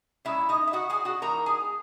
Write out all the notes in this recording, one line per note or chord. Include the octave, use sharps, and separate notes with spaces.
A#2 G#3 C#4 E4 E5
D#4 D#5
E5
F#4 F#5
G#4 G#5
F#4 F#5
E3 A#3 D#4 A#4 A#5
G#4 G#5